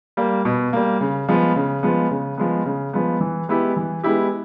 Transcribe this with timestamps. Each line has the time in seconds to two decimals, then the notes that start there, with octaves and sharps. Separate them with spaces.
0.17 G3 A#3
0.45 B2
0.73 G3 A#3
1.01 C#3
1.28 F3 G#3 B3
1.56 C#3
1.83 F3 G#3 B3
2.11 C#3
2.38 F3 G#3 B3
2.65 C#3
2.93 F3 G#3 B3
3.20 E3
3.49 G#3 B3 E4 G4
3.77 E3
4.04 G#3 B3 E4 G4